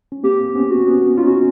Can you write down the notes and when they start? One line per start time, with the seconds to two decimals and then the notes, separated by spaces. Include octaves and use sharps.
0.12 C#4
0.23 A#3 C4 G4
0.50 C4
0.55 B3 C#4
0.71 F#4
0.86 B3 C#4
1.17 C#4 D#4 F4
1.27 F#4